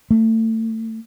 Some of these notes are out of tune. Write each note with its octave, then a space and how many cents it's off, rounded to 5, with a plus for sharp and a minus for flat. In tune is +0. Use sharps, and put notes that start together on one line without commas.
A3 +30